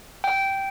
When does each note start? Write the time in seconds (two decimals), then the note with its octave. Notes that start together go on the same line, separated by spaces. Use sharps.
0.24 G5